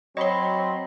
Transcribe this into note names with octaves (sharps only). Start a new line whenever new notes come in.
F#3 C4 C#5 D#5 B5 C6